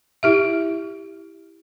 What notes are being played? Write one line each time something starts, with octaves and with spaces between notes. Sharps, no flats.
E4 G4 E5